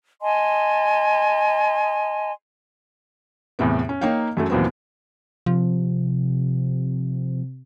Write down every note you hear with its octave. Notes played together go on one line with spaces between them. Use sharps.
D#5 G#5 A5 C6
E2 A2 C3 B3
C#4
A#3 D#4 C#5 F5 G5
F#2 F#3 A3
D#2 A#2 E3 F#3 B3 C4
C3 F3